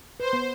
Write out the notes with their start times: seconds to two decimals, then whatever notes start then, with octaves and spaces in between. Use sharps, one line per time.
0.19 B4 C5
0.33 B3